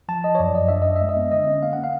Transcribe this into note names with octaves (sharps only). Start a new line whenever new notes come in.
F3 A5
F3 D#5
C#5
F#2 D5
F#2 D#5
D4 E5
D4 D#5
E5
G#3
D#5
B3
D3 D#5
C#4
A#3 F5
F#5
A#3
F5